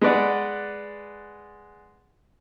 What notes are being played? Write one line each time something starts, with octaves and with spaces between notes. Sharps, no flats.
G#3 B4 D5 F#5